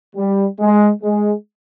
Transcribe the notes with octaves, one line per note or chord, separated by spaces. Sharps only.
G3
G#3
G#3